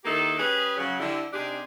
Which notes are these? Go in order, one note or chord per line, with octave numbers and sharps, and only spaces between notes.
D#3 A#3 D#4 E4 G4 A4
G3 C#4 G#4 B4
C#3 F#3
D3 G3 E4
C3 C4 D4 D#4 G4 G#4